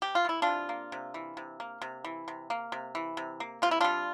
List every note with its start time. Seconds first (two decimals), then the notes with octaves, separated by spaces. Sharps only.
0.02 C3 G4
0.15 F4
0.25 E3 E4
0.42 C3 D4 F4
0.69 A#3
0.92 C3
1.14 E3
1.37 C3
1.60 A#3
1.82 C3
2.04 E3
2.28 C3
2.50 A#3
2.72 C3
2.95 E3
3.17 C3
3.40 A#3
3.62 C3 F4
3.71 E4
3.81 G3 D4 F4